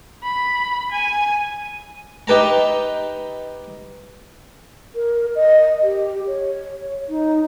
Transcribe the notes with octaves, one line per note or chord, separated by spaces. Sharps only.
B5
G#5
D#4 G4 B4 A5 A#5
A#4
D#5
G4
C#5
D#4